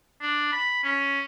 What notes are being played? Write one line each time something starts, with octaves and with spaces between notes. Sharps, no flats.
D4
B5
C#4